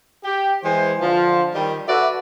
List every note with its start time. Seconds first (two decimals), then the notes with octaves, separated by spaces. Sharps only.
0.24 G4
0.64 E3 G#3 C5
1.01 D3 F3
1.54 D#3 G3
1.87 F#4 A4 B4 D5 E5